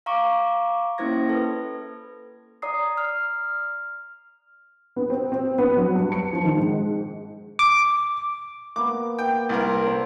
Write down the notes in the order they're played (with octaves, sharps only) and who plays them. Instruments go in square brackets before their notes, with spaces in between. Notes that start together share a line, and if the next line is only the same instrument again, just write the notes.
[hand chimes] F5 A#5 C#6 D6
A#3 C#4 E4 C5 G#6 A#6
A4 B4
D5 A#5 D#6 C7
F6
[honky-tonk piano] B3
C4
C4
B3
F#3
G2
C#7
F3
D#3
G#2
[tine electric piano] D6
[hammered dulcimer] A#3 B3 [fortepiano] D6
[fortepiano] G5
C2 A#4
[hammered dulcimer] A4 C5 D5